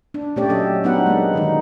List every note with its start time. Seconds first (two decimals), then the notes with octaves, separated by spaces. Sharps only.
0.14 D4
0.36 A#2 A3 C#4 G4 C#5 D5
0.49 A#2 F#3 A4 D#5
0.84 F#3 B3 D4 D#4 B4 F#5
1.06 G#3 A#3
1.33 D3 D#3 D#4